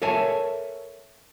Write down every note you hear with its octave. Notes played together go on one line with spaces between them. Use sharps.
A4 A#4 C#5 E5 G#5 A5